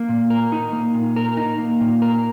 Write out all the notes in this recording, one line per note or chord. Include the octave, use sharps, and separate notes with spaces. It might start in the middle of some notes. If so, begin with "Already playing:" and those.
Already playing: A#3
A#2
A#4
D#4
A#3
A#2
A#4
D#4
A#3
A#2
A#4